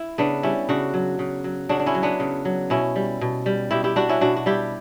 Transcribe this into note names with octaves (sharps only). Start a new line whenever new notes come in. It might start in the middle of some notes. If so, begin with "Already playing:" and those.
Already playing: E4
C#3 B3 D4
G3 C#4 E4
C#3 D4 F#4
F#3
C#3
F#3
C#3 D4 F#4
D4
C#4 E4
F#3
B3 D4
C#3
F#3
B2 C#4 E4
G3
B2
G3
B2 E4 G4
E4 G4
G3 D4 F#4
C#4 E4
B2 D4 F#4
F#4
G3 E4 G4